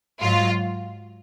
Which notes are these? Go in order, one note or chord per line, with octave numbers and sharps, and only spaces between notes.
G#2 F#3 F4